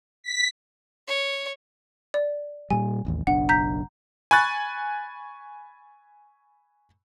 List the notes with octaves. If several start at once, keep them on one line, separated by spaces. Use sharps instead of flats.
B6
C#5
D5
A#2 G3 G#5
E1 A1 D#2
F#1 B1 D4 F#5
A#5 G6 B6
G#5 B5 C#6 F#6 A6